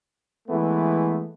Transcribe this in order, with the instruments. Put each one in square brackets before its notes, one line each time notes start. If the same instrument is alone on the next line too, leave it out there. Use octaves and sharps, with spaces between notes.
[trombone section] E3 G#3 A3 B3